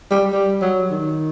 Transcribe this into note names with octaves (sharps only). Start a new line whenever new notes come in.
G3
G3
F#3
D#3